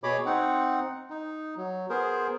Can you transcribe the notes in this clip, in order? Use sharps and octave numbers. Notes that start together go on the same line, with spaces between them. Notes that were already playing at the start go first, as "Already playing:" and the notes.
B2 G#4 C#5 D#5 B5 D6
C4 D#4 F#5
D#4
F#3
B3 G#4 A#4 C5